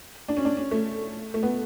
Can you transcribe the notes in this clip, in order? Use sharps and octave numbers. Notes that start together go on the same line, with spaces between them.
D4
C#4
D4
C#4
A3
A3
B3